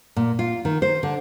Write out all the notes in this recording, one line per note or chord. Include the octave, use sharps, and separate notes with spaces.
A#2
F4
D#3
C5
D3